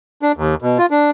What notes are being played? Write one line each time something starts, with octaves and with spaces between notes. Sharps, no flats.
D4
D#2
B2
F4
D4